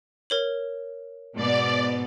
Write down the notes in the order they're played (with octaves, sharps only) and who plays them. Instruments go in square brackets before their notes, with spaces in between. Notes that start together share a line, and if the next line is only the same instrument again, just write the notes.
[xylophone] A#4 C#5 F#7
[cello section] G#2 B2 B3 [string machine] D5